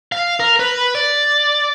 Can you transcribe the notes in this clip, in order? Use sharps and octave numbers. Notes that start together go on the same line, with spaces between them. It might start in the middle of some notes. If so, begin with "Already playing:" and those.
F5
A#4
B4
D5